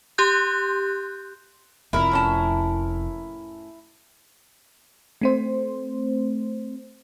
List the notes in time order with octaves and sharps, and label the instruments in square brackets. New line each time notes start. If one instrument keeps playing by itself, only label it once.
[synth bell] G4 C6 F#6 G6
[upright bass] F1 F2 [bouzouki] E4 A#4
[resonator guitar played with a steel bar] A2 C#4 A5
[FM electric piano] A3 C4 C5